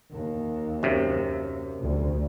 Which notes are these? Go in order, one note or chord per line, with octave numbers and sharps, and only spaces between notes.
D#2
F#2 C3
D2